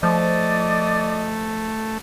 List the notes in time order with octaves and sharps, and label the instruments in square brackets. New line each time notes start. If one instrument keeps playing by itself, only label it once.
[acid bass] F3 [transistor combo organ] A3 [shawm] D5 [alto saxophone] D#5